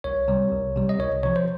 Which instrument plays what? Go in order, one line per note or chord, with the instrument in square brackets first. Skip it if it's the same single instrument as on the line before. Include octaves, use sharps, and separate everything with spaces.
[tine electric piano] C2 C#5
C3 G3
C2
C3 G3
D#5
C2 C#5
C3 F3 C#5
C5